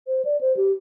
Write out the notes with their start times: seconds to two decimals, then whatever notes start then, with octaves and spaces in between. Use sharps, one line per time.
0.07 C5
0.25 D5
0.41 C5
0.57 G4